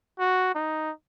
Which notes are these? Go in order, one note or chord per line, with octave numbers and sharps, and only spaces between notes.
F#4
D#4